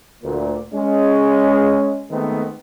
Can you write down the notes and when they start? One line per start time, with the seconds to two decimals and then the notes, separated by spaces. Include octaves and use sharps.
0.22 D2 A#2
0.74 G#3 C#4
2.10 D#3 G#3 A3 B3 C4